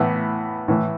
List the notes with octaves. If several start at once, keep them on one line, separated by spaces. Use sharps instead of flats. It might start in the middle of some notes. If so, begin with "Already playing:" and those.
Already playing: A2 E3 B3
A2 E3